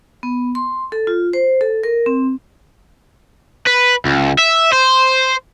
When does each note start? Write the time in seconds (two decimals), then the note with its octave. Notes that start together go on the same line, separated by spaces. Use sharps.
0.23 B3
0.55 C6
0.92 A4
1.07 F4
1.33 C5
1.61 A4
1.83 A#4
2.06 C4
3.67 B4
4.06 C#2
4.39 E5
4.73 C5